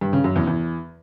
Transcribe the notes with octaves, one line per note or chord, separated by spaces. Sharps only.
G2
C#3
F#2
E2
E2